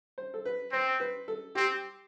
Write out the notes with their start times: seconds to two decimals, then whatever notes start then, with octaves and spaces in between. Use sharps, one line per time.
0.18 C5
0.34 A4
0.45 B4
0.72 C4 C5
1.00 B4
1.28 A4
1.55 C4 G4